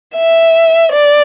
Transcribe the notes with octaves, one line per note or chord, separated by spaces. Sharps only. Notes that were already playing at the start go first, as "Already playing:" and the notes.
E5
D5